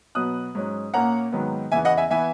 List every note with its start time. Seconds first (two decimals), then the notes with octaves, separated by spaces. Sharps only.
0.15 B2 F#3 B3 D#6 F#6
0.55 G#2 F#3 C#4
0.94 A#2 A#3 C#4 F#5 A#5
1.32 G#2 D#3 F#3 B3
1.72 E2 C#3 E3 B3 E5 G#5
1.85 D#5 F#5
1.97 E5 G#5
2.11 E3 B3 E5 G#5